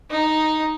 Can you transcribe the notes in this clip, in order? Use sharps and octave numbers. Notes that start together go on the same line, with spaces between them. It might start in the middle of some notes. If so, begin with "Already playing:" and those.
D#4